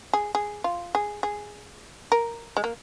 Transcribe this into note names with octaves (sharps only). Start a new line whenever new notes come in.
G#4
G#4
F4
G#4
G#4
A#4
G#3
A#3